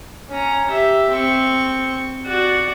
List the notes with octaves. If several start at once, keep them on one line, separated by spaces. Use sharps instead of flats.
C#4 A#5
G4 E5
C4 C#6
F#4 D5